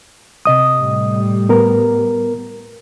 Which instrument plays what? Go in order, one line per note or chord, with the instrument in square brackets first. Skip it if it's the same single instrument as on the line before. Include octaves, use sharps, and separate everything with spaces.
[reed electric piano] C3 D#5 D#6
[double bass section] A2 G3
[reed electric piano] B3 A#4